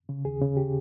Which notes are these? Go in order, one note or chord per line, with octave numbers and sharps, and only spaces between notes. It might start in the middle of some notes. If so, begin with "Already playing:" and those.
C#3
D#2 G#4
C#3
G4